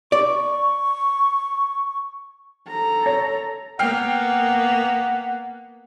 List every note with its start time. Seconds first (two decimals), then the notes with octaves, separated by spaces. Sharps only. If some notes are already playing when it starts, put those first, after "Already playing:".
0.12 D5 C#6
2.68 A4 A#5
3.06 C#5
3.79 A#3 B3 F#5 G5 F6 C7